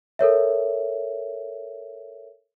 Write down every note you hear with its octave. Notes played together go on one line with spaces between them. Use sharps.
A4 A#4 C#5 E5